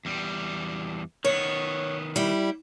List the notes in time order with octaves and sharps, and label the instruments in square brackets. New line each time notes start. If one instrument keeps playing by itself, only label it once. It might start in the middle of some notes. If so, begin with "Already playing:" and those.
[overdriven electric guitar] E2 G3
[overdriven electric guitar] D#3 B3 [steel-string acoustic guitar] C#5
[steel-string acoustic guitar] G3 E4